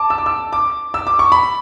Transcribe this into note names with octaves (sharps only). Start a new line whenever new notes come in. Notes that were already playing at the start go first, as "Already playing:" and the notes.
Already playing: A5 D6
E6
D6
E6
D6
E6
D6
C#6
B5